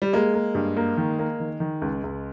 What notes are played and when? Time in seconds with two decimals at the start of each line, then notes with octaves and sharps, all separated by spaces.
0.02 G3
0.13 G#3 A#3
0.34 A#3
0.55 G2
0.77 A#3
0.97 D#3
1.19 A#3
1.40 D#3
1.60 D#3
1.82 C#2
2.04 C#2